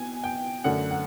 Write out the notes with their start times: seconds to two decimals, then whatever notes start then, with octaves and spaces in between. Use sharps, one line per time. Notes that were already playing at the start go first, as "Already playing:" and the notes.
Already playing: B2 G#5
0.24 G5
0.64 F#2 D3 F#3 A3 F#5
0.91 F#5